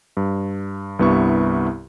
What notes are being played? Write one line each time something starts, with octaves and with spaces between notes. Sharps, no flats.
G2
C2 G2 B3 E4 C#6